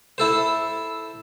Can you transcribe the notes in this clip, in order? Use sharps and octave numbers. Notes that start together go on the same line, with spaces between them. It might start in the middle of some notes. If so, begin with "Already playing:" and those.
E4 A4 C5